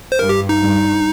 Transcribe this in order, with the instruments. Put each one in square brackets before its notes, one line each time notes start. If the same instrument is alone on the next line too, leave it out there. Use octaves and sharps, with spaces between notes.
[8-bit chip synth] C5
[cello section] G2 [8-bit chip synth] A#4
[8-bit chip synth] G4
D#4
[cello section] G2